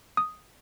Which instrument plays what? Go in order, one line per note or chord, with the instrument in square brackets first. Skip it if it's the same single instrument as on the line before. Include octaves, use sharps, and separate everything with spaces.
[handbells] D#6